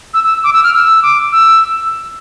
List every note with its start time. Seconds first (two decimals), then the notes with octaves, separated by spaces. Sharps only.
0.14 E6
0.24 E6
0.44 D6
0.53 E6
0.64 F6
0.73 E6
1.03 D6
1.32 E6